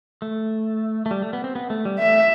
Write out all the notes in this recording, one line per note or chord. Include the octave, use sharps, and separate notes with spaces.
A3
A3
G3
A3
B3
C4
B3
A3
G3
A3 E5